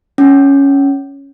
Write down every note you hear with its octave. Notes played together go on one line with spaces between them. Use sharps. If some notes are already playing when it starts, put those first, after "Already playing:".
C#4